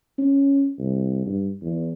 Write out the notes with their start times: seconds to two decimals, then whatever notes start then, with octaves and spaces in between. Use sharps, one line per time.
0.19 C#4
0.79 C2
1.27 G2
1.62 E2